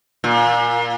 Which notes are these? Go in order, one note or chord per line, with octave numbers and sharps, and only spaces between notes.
A#2